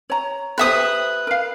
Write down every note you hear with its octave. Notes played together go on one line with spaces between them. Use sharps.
C#5 A#5
G4 B4 C5 E5 D#6
A#4 F5